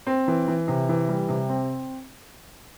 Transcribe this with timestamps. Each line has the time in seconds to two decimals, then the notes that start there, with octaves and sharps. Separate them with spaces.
0.07 C4
0.28 E3
0.48 E3
0.68 C3
0.89 E3
1.09 G3
1.29 C3
1.49 C4